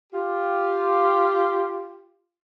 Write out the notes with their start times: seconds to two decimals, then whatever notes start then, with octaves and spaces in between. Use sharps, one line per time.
0.13 F4 G4